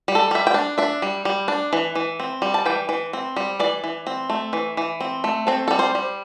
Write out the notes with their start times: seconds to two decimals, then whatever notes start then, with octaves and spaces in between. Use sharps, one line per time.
0.08 G3
0.15 A4
0.31 G3 E5
0.47 G5
0.54 D4
0.78 D4 E5
1.02 G3
1.25 G3
1.48 D4
1.73 E3
1.95 E3
2.20 C4
2.42 G3
2.54 A5
2.66 E3 G5
2.89 E3
3.13 C4
3.36 G3
3.60 E3 D5
3.84 E3
4.07 C4
4.30 A3
4.53 E3
4.77 E3
5.00 C4
5.24 A3
5.47 C4 A4
5.68 G3 A4
5.79 C5
5.95 G3